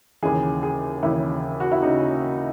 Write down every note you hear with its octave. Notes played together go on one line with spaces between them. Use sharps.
D#2 C#3 E3 G#4
G#4
D#2 C#3 E3 E4
F#4
E4
C#3 D#4